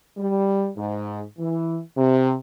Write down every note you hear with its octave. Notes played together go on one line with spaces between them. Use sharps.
G3
G#2
E3
C3